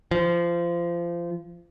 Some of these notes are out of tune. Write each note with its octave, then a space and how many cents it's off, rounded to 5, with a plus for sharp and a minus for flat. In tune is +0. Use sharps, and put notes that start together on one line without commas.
F3 -25